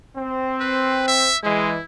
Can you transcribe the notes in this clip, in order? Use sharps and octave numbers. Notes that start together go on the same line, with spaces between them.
C4
B4
E5
E3 G#3 E4